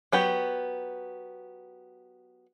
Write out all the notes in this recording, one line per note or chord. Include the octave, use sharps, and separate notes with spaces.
F#3 B3 G4